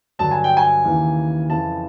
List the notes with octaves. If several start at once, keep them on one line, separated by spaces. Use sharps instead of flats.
G2 D3 F#3 A5
G#5
G5
G#5
D#2 C#3 E3
F2 C#3 E3 A5